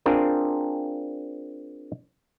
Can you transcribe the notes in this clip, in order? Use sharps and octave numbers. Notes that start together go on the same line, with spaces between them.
C4 D4 F4 G#4 A#4